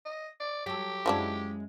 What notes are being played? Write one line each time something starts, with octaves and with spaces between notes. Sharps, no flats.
D#5
D5
F#3 G4 A4
F#2 F3 F#3 G#3 D4 E4